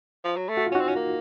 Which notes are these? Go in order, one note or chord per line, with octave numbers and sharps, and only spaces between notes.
F3
F#3
A3
F#4
F4
C#4
C4 D#4 F#4
C#4
A#3